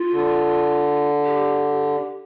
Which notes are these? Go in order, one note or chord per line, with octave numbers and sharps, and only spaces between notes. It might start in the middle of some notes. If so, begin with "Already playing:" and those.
Already playing: F4
D3
G4